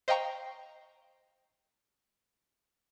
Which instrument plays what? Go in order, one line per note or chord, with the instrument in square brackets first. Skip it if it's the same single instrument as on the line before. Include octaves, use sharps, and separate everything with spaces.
[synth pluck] C5 D#5 F5 G5 A#5 C#6